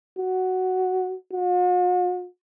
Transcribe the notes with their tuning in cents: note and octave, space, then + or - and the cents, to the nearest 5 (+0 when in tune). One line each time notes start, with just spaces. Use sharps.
F#4 +5
F#4 -45